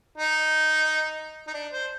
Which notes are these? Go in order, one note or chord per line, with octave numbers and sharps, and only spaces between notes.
D#4
D#4
D4
C5